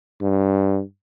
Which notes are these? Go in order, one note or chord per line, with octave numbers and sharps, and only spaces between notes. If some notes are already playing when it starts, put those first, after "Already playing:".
G2